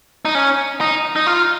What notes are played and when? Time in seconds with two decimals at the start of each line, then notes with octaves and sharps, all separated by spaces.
0.25 D#4
0.35 C#4
0.81 D#4
1.16 D#4
1.27 F4